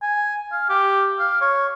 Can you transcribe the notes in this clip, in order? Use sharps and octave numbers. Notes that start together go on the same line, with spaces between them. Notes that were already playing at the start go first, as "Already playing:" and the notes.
G#5
F5
G4
F5
C#5